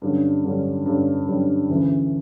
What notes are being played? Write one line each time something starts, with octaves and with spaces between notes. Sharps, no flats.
G2 D3 G3 C#4
G2 D3 G3 C#4
G2 D3 G3 C#4
G2 D3 G3 C#4
D2 C#3 E3